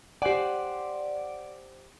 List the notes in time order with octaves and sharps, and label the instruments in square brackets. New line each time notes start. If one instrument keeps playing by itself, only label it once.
[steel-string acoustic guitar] G4 G#5 [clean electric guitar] C5 F#5 [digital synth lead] D5